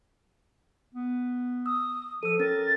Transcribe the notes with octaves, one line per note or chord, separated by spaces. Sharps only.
B3
D#6 E6
F3 A4 E6 D#7
C#4 A#4 A6